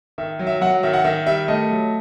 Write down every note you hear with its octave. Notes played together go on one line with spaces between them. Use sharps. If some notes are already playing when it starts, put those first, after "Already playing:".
D#3 E5
F#3
E5
F#3 F#5
D#3 E5
F#5
D#3 E5
G3 E5
A3 D#5
F#3